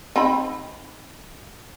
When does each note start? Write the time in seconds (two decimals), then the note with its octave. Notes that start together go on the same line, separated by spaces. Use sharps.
0.16 C4 D#4 B5